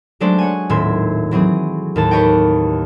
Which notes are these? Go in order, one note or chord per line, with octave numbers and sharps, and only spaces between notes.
F#3 G#3 A3 D4 C5 D5
C#5 F#5 G#5
D#1 A2 C4 E5 C6 G#6
E3 F#3 C4 G#4
D#2 A2 A5
G4 B4 C#5 D#5 G5